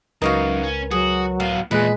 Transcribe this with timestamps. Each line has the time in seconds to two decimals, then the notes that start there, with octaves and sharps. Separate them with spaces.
0.22 C#2 F#2 D#4 F#4 A#4 B4 F5
0.63 C#4
0.91 F#3 F#4 G#4
1.40 A2 B3 F5
1.71 E2 A#2 G#3 B4 D#5 F#6